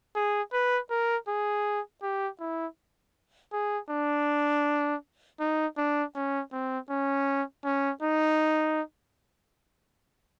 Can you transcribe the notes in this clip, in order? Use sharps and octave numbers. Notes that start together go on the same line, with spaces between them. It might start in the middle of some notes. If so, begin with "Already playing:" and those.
G#4
B4
A#4
G#4
G4
E4
G#4
D4
D#4
D4
C#4
C4
C#4
C#4
D#4